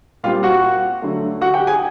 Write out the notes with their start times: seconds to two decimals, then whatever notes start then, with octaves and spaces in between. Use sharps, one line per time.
0.24 A#2 G3 C4 F4 F5
0.43 F#4 F#5
1.02 D3 F#3 A3
1.41 F#4 F#5
1.54 G4 G5
1.67 G#4 G#5